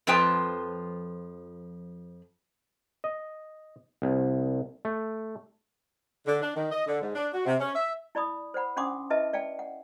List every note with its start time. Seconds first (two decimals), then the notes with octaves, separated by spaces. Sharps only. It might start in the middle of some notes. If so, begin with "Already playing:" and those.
0.07 F2 F3 F4 B4 G5 A5
3.04 D#5
4.02 C2
4.85 A3
6.27 D3
6.42 D4
6.55 D#3
6.71 D#5
6.87 D3
7.01 G#2
7.15 D4
7.33 F#4
7.46 C3
7.59 C#4
7.75 E5
8.15 E4 D5 B5 D#6
8.54 C5 D5 F#5 B5
8.76 C#4 D4 F#5 C6 D6 D#6
9.10 E4 B4 D#5 E5 A5
9.33 D5 F5 G5 A5
9.59 F#5